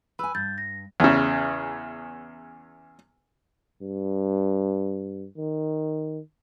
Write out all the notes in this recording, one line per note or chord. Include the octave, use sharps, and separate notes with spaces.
B4 G#5 B5 E6
G2 G6 A6
A#6
E2 C#3
G2
D#3